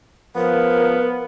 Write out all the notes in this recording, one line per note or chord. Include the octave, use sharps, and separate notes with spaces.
F3 B3 A#4